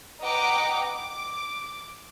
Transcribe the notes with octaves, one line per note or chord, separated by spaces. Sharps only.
B4 D#5 F#5 G5 A#5 D6
D6